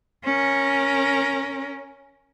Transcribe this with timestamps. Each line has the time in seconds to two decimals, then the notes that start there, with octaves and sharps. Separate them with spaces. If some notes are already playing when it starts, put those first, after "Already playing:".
0.24 C#4 A#4